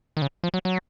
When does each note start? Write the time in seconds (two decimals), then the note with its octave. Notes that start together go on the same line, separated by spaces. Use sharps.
0.17 D#3
0.22 C#3
0.44 F3
0.54 F#3
0.65 F#3